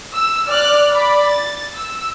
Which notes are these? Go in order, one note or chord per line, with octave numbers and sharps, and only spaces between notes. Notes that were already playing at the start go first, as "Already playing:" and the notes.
E6
D5 F6 F#6
D5 B5
A6
E6